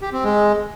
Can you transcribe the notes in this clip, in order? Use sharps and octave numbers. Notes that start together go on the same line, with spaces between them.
G4
C4
G#3